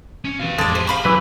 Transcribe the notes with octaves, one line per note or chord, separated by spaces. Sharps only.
C#4
B2 E3 G4 F5
A1 F2 G#3 A4 D5
G4 G#4 C5
F5 B5 C#6
F#2 B2 E3 F#3 B4